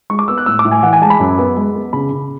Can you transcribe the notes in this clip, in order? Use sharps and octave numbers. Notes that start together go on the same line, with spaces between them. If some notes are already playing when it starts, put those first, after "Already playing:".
G#3 C#6
D6
B3 E6
F#6
A2 E6
D6
A2
G#5
E3 F#5
G#5
G#3 A5
B5
F#2
B3
G#3
B3
C#3 B5
C#3